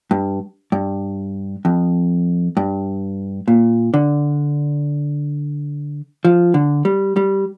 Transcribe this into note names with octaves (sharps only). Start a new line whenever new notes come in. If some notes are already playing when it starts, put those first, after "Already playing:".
G2
G2
F2
G2
A#2
D3
F3
D3
G3
G3